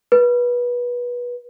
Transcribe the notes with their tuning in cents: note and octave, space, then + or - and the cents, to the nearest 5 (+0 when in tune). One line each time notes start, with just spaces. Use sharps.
B4 -25